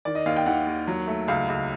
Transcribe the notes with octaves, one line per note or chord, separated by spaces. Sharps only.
D#3 D5
D#5
D#2 F5
G5
D#2 F#5
D#2
F#3
A3
C#2 F5
C#2